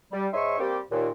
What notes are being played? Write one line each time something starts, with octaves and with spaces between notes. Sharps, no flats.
G3
G#2 D#4 C#5 E5 C6 C#6
G3 A#3 C4 G4
D#2 A#2